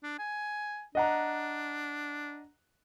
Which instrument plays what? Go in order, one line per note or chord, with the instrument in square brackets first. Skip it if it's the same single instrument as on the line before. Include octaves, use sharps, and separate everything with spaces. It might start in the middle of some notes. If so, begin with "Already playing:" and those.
[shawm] D4
G#5
[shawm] D4 [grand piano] D#5 F#5 A#5